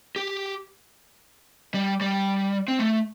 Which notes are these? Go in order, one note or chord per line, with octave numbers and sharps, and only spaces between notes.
G4
G3
G3
C4
A3